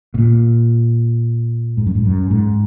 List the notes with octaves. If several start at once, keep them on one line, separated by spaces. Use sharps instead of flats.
B2
A#2
G#2
F#2
G#2
F#2
G#2